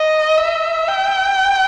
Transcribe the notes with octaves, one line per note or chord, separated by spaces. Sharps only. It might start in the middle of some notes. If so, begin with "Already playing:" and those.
Already playing: D#5
E5
G5